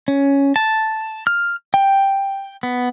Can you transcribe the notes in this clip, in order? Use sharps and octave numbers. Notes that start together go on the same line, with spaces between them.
C#4
A5
F6
G5
B3